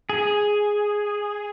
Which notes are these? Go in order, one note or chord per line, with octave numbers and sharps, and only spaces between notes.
G#4